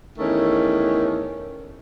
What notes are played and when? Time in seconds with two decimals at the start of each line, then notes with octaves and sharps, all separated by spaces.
0.18 E2 D#3 E3 A3 C#4